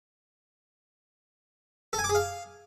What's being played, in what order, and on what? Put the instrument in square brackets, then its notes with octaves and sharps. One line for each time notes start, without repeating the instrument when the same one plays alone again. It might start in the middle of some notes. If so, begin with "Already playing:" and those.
[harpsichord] A4
G#5
D6
G#4
F5